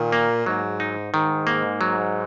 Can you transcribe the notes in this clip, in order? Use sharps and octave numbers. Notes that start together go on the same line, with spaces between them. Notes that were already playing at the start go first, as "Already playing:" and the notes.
Already playing: A#2 D#3
A#3
G#2 F#3
D#4
G#2 D#3
A#3
F#3